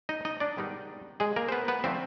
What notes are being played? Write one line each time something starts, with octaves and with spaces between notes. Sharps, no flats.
D#4 D#5
D#4 D#5
D4 D5
G#2 D#3 G3 B3 D#4
G#3 G#4
A#3 A#4
C5
B3 B4
B3 B4
D3 F3 A3 C4 C5